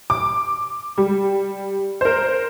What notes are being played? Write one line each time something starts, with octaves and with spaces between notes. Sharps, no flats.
D6
G3
A#4 C5